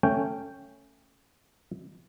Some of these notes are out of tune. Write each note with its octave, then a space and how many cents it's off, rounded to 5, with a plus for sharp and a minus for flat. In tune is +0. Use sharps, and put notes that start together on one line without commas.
A3 +20 C#4 +0 G5 +0